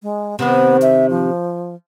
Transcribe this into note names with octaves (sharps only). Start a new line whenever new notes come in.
G#3
C3 D#3 B3
E5
F3